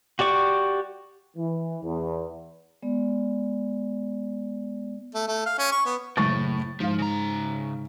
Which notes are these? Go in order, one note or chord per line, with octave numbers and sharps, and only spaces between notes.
F#4 G4 D5 C#6
E3
E2
G#3 B3 D5
A3
A3
F5
C#4
C#6
B3
F#1 A2 C#6 A6
G#2 F3 F5
C#3 A#5